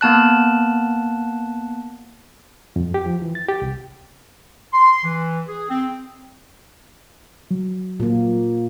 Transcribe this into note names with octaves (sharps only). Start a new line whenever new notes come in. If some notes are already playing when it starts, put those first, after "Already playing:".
A#3 B3 A5 F#6
F2
G4
F3
E3
A6
G4
C2
C6
E3
G#4
C4
F#3
A#2 A#3